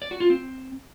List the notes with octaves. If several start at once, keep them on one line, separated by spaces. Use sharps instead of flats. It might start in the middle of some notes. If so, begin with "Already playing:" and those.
D5
F#4
F4
C4